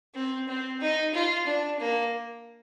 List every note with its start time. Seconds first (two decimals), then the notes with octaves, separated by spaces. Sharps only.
0.15 C4
0.48 C4
0.81 D#4
1.14 F4
1.46 D4
1.80 A#3